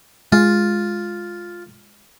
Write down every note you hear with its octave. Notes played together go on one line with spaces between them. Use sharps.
G#3 F4